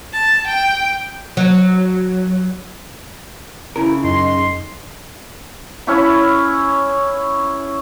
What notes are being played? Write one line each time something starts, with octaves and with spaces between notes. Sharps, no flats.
A5
G5
F#3
C#3 E4 A#4
F#2 D#4 D#5 C6
C#4 E4 C#5 B5